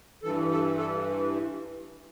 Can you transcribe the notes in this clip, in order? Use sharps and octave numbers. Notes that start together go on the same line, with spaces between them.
G2 E3 A4
A4
A4